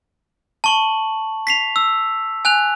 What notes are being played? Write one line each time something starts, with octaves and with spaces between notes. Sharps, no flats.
A5 C#6 F#7
B6 C7 F7
E6
G#5 F#6 F7